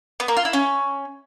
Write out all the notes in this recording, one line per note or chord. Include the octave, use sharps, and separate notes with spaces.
B3
A#3
F4
E4
C#4